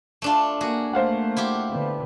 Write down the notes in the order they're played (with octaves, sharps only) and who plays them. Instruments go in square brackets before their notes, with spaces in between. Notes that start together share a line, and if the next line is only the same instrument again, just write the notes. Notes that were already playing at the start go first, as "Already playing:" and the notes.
[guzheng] A3 D4 F4
[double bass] A#3 [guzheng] F#4 G#4
[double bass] A3 A#3 [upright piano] C5 F5 F#5
[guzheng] E4 F4 G4
[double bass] D3 B3